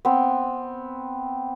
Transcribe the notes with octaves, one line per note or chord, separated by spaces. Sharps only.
B3 C4